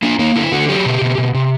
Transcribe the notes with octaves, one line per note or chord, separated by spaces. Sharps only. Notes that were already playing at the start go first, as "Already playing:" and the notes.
A#3 D4
A#3 D#4
D3 E4
D3 F#4
F#3 G4
B2
B2
B2
C3